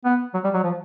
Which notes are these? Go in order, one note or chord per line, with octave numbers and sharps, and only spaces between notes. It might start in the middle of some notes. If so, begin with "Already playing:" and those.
B3
F#3
G3
F#3
F3